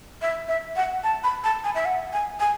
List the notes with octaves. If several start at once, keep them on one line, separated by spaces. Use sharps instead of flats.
E5
E5
F#5
A5
B5
A5
G#5
E5
F#5
G#5
G#5